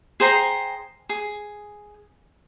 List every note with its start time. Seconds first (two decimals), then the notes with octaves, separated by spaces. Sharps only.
0.20 G#4 C5 G5 A#5
1.09 G#4